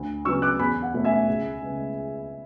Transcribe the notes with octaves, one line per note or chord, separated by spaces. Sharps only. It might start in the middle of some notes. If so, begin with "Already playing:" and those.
Already playing: D2
C#3 F#3 B3 C#6 E6
D6 F#6
E2 G#5 B5
F#5
B2 A3 C#4
E5 G#5
C#2
C#3 G#3 B3